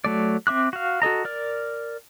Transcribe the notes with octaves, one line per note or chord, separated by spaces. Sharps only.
F#3 A3 D5
C4 E5 D6 F#6
F#4 F5
F#4 A4 D#5 A#5
A#4 D5 F6